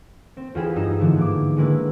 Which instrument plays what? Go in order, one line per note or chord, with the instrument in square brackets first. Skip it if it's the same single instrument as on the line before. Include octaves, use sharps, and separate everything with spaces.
[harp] C4
E2 F4 G4 G#4 B5 E7
G2 D#4 D#5 A#5 E6
G#2 D3 E3 F3 A#3 B3
D4 E4 D6
D3 D#3 G#3 A#3 E4 B4